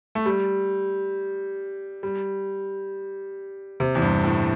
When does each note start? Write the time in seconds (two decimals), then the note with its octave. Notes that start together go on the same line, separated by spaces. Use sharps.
0.15 A3
0.26 G3
2.03 G3
3.80 C3
3.95 E2
4.02 G2
4.24 A2